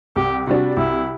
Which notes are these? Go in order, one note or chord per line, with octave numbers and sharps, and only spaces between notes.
C2 G4
C3 G3 D4 F#4
C2 E4